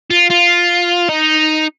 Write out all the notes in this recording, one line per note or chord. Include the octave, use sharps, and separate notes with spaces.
F4
F4
D#4